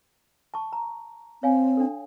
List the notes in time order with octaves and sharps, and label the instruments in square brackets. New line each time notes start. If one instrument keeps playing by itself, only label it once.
[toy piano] A5 C#6
A#5
[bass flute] C4 [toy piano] C#5 F5 G#5
[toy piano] D4 A4